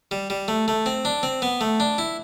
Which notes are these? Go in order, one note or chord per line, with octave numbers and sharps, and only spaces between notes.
G3
G3
A3
A3
C4
D4
C4
B3
A3
D4
E4